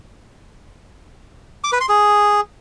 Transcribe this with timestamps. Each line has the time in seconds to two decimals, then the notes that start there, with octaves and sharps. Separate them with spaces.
1.64 D6
1.72 B4
1.81 C6
1.89 G#4